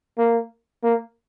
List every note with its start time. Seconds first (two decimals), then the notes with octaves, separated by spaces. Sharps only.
0.18 A#3
0.83 A#3